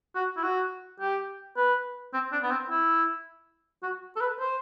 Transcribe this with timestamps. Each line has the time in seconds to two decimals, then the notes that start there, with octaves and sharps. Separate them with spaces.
0.15 F#4
0.37 E4
0.43 F#4
1.00 G4
1.57 B4
2.14 C4
2.32 D4
2.43 B3
2.51 C4
2.70 E4
3.83 F#4
4.16 A4
4.21 B4
4.39 C5